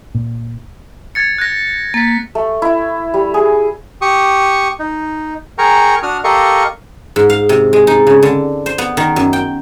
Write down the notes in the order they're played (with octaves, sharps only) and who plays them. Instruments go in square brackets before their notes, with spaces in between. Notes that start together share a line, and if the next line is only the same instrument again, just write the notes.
[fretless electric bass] A#2
[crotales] G#6 A6 C#7
F#6 G#6 A#6
[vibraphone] A#3 [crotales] A6 B6
[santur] A3
E4
G3
G#4
[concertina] G4 C#6 D#6
D#4
G#4 A#4 G5 A#5 C#6
D4 F#4 D#6 F6
G4 A4 A#4 D#5 F5 C#6
[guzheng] G#2
F5
C3
G#3
D#4
C#3
D3
C5
B3
D#3
F#2
G5